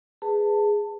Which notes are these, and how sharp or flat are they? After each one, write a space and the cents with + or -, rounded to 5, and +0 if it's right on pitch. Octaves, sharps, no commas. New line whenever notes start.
G#4 +0 B4 +10 A5 +20